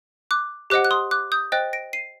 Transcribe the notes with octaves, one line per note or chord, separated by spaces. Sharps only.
D6 F#6
G4 C5 D#5 F#5 D6 F#6
F#6
C6 D#6
D6 F#6
D#6 G6
C5 D#5 G5 F#6 A6
A#6 D7
C7 D#7